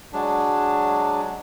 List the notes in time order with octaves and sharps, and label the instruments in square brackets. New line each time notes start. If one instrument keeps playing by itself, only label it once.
[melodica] F#3 G#3 D4